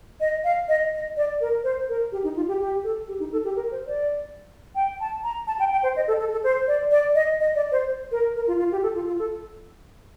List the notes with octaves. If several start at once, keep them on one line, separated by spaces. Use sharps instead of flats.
D#5
F5
D#5
D#5
D5
A#4
C5
A#4
G4
D#4
F4
G4
G4
A4
G4
D#4
A4
G4
A#4
C5
D5
G5
A5
A#5
A5
G5
G5
C5
D#5
A4
A4
A4
C5
D5
D5
D#5
D#5
D5
C5
A#4
A#4
F4
F4
G4
A4
F4
F4
A4